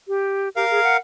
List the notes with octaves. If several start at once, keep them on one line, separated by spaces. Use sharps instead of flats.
G4
G4 A#4 F5
G#4
F#5